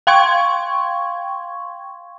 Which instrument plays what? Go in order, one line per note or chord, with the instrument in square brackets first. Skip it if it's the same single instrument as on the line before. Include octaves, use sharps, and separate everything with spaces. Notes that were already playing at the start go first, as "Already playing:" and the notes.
[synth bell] F5 G5 C6 C#6 G#6